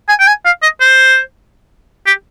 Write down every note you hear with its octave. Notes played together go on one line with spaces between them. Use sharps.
G#5
G5
G#5
F5
D#5
C5
G4